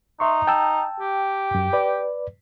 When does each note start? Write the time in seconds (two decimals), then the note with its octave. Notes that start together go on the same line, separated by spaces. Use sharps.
0.20 D#4 E5 C6 C#6
0.47 G5 A5 E6
1.01 G4
1.55 F#2
1.73 B4 D5